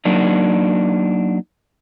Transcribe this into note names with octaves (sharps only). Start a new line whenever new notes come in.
F#3 A#3 D4 D#4